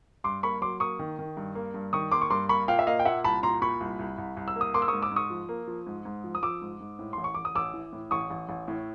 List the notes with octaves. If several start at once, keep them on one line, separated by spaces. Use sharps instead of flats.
G2 C6 D6
A#3 B5 C#6
F#3 C6 D6
A#3 C#6 D#6
D#3
D#3
G2
A#3
G2
D#3 C#6 D#6
A#3 C6 D6
C#6
G2 C6 D6
A#3 B5 C#6
A#2 F5 G5
E5
A#3 D#5 F5
G5
A#2 E5 F#5
C2 A5 B5
A#2 A#5 C6
A#2 B5 C#6
C2
C2
C2
C2
E6
A#3
D#6
A#3 C6 D6
E6
G#2 C#6 D#6
D6 E6
G#2 C#6 D#6
F3
A#3
F3
G#2
G#2
F3
D#6
F3 D6 E6
G#2
G#2
A2
A1 C6
C#6
A1 D6
D#6
A1 D6 E6
E3
A2
A1 C#6 D#6
A1
A1
A2